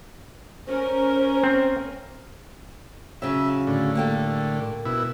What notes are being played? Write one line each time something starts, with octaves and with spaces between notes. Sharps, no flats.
C#4 A#4 C5
C4
C#3 F#3 E5
A2 D3
A#3 G4 A4
B2 E4